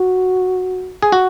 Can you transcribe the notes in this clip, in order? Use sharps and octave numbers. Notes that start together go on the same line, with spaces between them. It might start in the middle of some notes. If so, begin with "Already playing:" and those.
Already playing: F#4
G#4
F#4